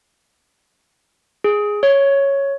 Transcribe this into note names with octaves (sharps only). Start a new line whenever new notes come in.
G#4
C#5